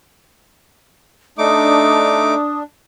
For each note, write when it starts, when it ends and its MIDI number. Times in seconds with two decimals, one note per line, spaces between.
1.38 2.34 57
1.38 2.63 62
1.38 2.34 63
1.38 2.34 86
1.38 2.59 87